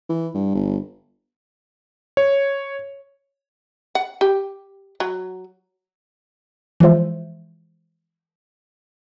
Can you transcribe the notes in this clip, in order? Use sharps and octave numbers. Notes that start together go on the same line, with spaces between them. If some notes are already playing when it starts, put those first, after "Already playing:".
E3
G2
G1
C#5
F#5
G4
F#3
E3 F3 G#3 F4 C5 E5